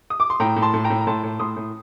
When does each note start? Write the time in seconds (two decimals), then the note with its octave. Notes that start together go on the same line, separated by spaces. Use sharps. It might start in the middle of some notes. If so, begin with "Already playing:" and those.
0.10 D#6
0.20 D6
0.30 C6
0.40 A2 G5 A#5
0.56 A2
0.62 A5 C6
0.74 A2
0.84 G5 A#5
0.90 A2
1.01 A#5
1.07 A2 A5 C6
1.23 A2
1.40 A2 C6 D#6
1.57 A2